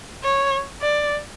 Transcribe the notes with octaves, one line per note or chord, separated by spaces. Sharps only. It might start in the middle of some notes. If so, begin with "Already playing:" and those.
C#5
D5